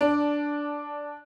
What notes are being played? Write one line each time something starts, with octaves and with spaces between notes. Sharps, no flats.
D4